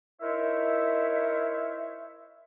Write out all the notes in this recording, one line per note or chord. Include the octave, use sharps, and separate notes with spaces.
D#4 E4 A#4 C5 C#5 E5